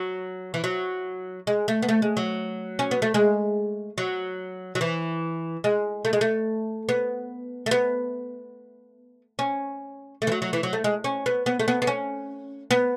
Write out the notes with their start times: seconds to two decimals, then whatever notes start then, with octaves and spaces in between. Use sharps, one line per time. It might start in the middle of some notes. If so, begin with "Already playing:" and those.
Already playing: F#3
0.54 E3
0.64 F#3
1.47 G#3
1.68 A3
1.82 B3
1.89 A3
2.02 G#3
2.17 F#3
2.79 C#4
2.91 B3
3.02 A3
3.14 G#3
3.98 F#3
4.75 F#3
4.81 E3
5.64 G#3
6.05 A3
6.13 G#3
6.21 A3
6.89 B3
7.66 A3
7.71 B3
9.39 C#4
10.22 A3
10.27 E3
10.32 F#3
10.42 F#3
10.53 E3
10.63 F#3
10.73 A3
10.84 G#3
11.04 C#4
11.26 B3
11.46 B3
11.60 A3
11.68 B3
11.82 B3
11.87 C#4
12.71 B3